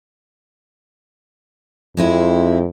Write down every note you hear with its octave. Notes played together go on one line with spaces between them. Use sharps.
F2 G#3 C4 E4